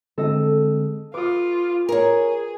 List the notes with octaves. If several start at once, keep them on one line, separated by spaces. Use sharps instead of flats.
D3 G#3 C4 A4 D#5
F4 B4 D6 D#6
G#4 A#4 C#5